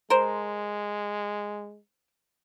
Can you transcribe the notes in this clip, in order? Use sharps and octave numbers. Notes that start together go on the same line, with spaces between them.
G#3 A#4 C5